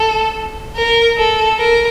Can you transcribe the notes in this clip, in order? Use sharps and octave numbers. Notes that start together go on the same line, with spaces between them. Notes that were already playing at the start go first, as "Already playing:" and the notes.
Already playing: A4
A#4
A4
A#4